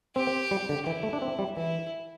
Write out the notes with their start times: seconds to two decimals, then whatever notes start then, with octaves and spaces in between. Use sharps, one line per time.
0.15 C4 G4
0.51 G3
0.69 D3
0.87 E3 E4
1.03 A3
1.13 D4
1.22 C4
1.39 G3
1.57 E3 E4